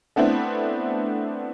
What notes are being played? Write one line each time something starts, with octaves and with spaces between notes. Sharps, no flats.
A3 B3 C4 D4 E4